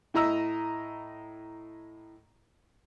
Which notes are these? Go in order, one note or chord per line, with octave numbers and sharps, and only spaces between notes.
A2 E4 D#5 A#5 E6